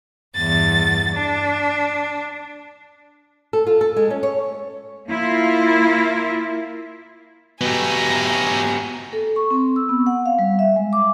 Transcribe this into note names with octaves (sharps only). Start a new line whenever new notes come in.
E2 G2 A6
D4
A4
F4
A4
G#3
C#4
C#5
A#3 E4 F4
B2 F#3 A3 B3 G4 G#5 A#5
A4
C#6
C4
E6
B3
F#5
F5
G3
E5
G#3
D6